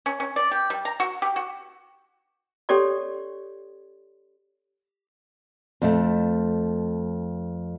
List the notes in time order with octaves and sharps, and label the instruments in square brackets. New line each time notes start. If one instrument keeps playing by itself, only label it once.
[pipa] C#4
C#4
D5
G4
G3
A#5
F#4
G4
F#4
[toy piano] C#4 G4 A4 C#5 D5 C6
[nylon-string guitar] F2 A3